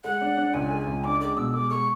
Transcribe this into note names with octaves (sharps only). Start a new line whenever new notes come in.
G#3 F#5
D4
D4
C#2 G#5
G#3
C#2
D4 D6
G#3 D6
B2 E6
G#3 D6
G#3 C#6